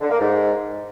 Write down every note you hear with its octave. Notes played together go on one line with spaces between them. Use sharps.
D3
A#3
G#2